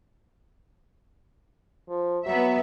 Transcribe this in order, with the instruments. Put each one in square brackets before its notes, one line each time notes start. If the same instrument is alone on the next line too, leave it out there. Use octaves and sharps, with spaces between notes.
[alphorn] F3
[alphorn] F#3 [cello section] B3 E5